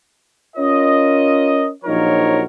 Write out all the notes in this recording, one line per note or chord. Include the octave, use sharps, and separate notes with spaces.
C#4 F4 A#4 C#5 D#5
A#1 F3 F#3 D#4 A#4 C#5